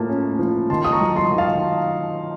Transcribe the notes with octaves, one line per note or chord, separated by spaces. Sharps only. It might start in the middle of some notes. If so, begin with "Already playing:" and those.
Already playing: A2 F3 A#3 A5
C#4
F3
D#3 A5 C6
D#6
A#5 C#6
F#3
A5 C6
D#3
F5 A5